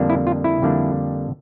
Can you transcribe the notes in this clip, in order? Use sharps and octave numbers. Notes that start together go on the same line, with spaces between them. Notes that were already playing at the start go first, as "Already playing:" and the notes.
Already playing: F2 D3 G3 A#3 D4
E4
F4
E4
F2 D3 G3 A#3 D4